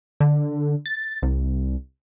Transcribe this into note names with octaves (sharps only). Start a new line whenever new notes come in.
D3
A6
C2